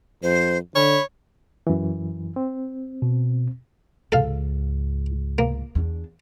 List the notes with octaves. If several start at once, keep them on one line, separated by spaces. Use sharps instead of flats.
F2 C5
D3 C#5 B5
F#2 E3
C4
B2
C#2 G#2 A4 F5
A#3
E2 D4